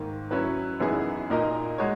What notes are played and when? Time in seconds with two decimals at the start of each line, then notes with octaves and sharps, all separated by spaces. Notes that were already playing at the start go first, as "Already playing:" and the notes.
Already playing: G#2 D#3 A#3
0.31 F#3 C#4 E4 B4
0.80 F#2 E3 B3 D#4 G#4
1.30 A#2 A#3 D#4 A#4 D#5
1.78 G#3 F#4 C#5